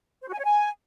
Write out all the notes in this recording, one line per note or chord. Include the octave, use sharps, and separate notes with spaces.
C5
F#4
G#5
C#5
G#5